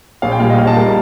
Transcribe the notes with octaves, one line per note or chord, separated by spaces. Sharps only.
A#1 F5
G5
A#2 G3 F5
D#5
A#1 F5
A5
A#2 G3 A#4